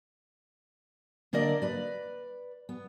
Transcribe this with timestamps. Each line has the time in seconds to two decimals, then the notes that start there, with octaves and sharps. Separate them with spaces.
1.33 D3 A#3 A#4 D5 D#5
1.62 B4 D5
2.69 B3